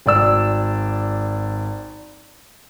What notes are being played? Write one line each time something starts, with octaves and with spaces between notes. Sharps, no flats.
G#1 D5 E6